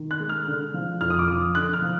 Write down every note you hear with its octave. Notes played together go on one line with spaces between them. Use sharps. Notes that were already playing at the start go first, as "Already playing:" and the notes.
Already playing: D#3
F#6
G#3
F6
D3
F3
F2 F6
D#6
D6
F3 D#6
D3 F#6
F6
F3